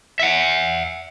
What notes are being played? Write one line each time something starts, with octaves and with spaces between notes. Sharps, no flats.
E5 F#5